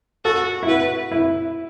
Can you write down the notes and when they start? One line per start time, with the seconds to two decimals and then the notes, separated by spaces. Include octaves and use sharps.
0.25 F#4 A4
0.63 E4
0.68 F#4 B4
1.12 E4